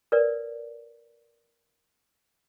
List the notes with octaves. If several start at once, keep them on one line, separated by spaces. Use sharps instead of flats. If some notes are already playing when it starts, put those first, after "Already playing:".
A#4 B4 D5